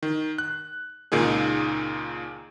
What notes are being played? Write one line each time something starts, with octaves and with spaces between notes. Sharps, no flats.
D#3
F#6
C#2 A#2 D#3 D#4 G#4